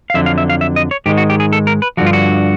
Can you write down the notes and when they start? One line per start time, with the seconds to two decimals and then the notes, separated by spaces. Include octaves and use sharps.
0.10 F5
0.14 F2 D3 F#3 E5
0.26 F5
0.38 E5
0.50 F5
0.61 E5
0.76 D#5
0.91 C#5
1.06 G#2 D#3 G#3 G4
1.18 F#4
1.30 G4
1.40 G#4
1.52 A4
1.67 A#4
1.82 B4
1.97 G2 D3 F3 F#4
2.06 F4
2.13 F#4